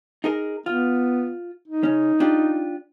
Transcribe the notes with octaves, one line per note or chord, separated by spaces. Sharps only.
D#4 G#4 A#4
B3 F4
D#4
C#3 C#4
D4 F4 G4